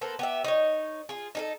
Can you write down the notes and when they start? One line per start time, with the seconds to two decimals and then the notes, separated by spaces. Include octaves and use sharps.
0.01 A#3 B3 A4 C5
0.19 B3 G4 E5
0.44 D#4 C#5
1.09 F4 G#4
1.35 D#4 G#4 A4